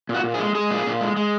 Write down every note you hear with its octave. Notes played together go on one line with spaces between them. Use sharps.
A#2
F#4
A#2
G#4
G#3
G#3 G#4
A#2
A#2
G#3
G#3